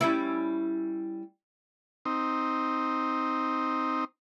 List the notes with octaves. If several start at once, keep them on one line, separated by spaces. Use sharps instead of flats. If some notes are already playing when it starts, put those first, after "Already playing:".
G3 C#4 E4
C4 D#4